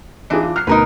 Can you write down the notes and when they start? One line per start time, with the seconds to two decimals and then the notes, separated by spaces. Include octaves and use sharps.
0.30 E3 C4 D4 D#4 F4 G#4
0.43 F4
0.56 F#3 F6 C7
0.67 D2 B2 D#4 A#4 B4